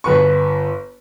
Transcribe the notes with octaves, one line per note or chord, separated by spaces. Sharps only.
G1 B4 C#6